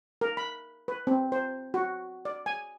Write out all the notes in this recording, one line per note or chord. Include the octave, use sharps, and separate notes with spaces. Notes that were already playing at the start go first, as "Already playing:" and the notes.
A#4
B5
B4
C4
C5
F#4
D5
G#5